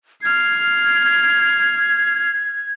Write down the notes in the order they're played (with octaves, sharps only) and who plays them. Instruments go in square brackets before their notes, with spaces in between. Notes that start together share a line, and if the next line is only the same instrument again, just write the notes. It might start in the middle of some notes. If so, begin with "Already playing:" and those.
[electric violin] F6 C7 [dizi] G#6